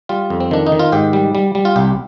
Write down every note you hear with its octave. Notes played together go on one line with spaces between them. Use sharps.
G3 F4
F2
C4
D#3 D4
D#4
D#3
F4
G#2 G4
G3
G3
G3
F4
C2 G4